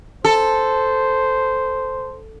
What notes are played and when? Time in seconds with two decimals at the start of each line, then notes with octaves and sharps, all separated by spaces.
0.25 A4 C5